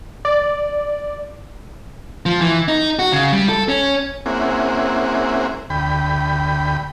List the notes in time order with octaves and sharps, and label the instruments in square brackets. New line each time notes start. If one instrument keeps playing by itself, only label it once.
[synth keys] D5
[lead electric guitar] F3
E3
D#4
F#4
C#3
G3
A4
C#4
[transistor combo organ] A#3 C4 C#4 E4 G#4 F#5
D2 G5 B5